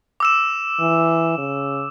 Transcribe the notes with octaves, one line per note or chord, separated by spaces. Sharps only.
D6 E6 E7
E3
C#3